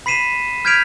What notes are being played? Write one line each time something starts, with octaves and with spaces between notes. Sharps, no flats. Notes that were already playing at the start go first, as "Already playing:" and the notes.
B5 B6 C7 D#7 E7
F6 G6 G#6 B6 D7 F7